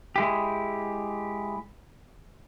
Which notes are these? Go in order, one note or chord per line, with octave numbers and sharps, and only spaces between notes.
G#3 E4 G4